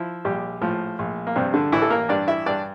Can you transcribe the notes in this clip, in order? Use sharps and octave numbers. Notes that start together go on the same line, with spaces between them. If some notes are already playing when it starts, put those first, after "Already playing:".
Already playing: F3 E4 E5
A#1 G3 G4
A2 F3 F4
A#1
A#3
G2 C3 C4
D3 D4
A1 E3 E4
A4
A#3 A#4
G2 D4 D5
E4 E5
G2 D4 D5